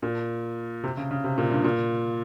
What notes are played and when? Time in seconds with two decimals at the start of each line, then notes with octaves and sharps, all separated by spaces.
0.02 A#2
0.84 C3
0.97 C#3
1.11 C#3
1.24 C3
1.38 A#2
1.51 G2
1.64 A#2